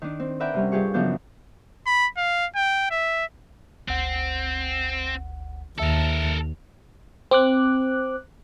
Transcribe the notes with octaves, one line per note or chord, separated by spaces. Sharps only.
D#3 D4
C4
A#4 B4 D5 E5 F#5 G5
C3 G3 C#4
G2 F4 G4 G#4 C#6
F#2 C#3 F3 B3 D4 G6
B5
F5
G5
E5
G1 D2 C4 F#5
D#2 A4 A#4 E5 A5
C4 D6 F#6